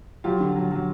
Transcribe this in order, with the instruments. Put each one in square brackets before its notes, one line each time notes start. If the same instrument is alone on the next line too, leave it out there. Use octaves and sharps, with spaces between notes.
[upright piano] F#3 F4 G4
D3
F#3
F#3